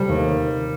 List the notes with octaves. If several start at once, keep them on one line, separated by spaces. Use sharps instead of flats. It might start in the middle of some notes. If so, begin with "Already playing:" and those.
Already playing: C3 G3 A3
D#2